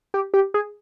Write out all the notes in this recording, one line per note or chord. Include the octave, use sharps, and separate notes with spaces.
G4
G4
G#4